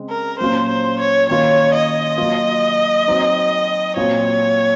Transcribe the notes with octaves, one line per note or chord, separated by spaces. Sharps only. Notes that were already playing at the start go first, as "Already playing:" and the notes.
Already playing: C#3 G#3 C4
A#4
A#2 F#3 A#3 C#4 F4 C5
C5
C#5
D#3 A#3 C#4 F4 C#5
D#5
F#3 A#3 F4
F#3 C4 D#4
A#2 F#3 C4 F4 C#5